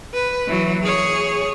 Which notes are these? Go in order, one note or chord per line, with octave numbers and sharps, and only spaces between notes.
B4
E3 F#3
G#4 C#5